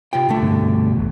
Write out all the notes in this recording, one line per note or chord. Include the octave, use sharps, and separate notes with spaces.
C3 F4 G5
C2 D3 A3
G2 B2
G#1 E2